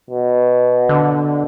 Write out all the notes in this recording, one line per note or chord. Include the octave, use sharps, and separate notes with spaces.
B2
D3